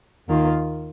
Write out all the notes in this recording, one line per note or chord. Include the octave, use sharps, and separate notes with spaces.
D#2 D#3 A#3 F4